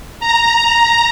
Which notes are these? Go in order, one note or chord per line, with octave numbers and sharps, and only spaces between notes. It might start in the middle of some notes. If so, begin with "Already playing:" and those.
A#5